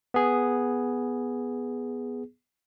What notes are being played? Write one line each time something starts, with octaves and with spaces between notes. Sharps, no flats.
B3 G#4